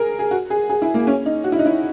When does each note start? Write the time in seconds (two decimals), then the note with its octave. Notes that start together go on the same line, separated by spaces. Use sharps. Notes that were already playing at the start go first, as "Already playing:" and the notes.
Already playing: G#4 A#4
0.19 G#4
0.31 F#4
0.50 G#4
0.69 G#4
0.82 E4
0.94 A#3
1.07 C#4
1.26 D#4
1.44 F#4
1.52 E4
1.59 D#4
1.66 E4